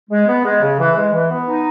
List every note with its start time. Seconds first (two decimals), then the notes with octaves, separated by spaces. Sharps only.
0.10 G#3
0.27 B3
0.44 G#3
0.61 C#3
0.78 E3
0.96 G#3
1.13 E3
1.30 B3
1.47 D#4